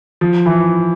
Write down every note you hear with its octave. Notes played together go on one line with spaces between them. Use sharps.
F3
E3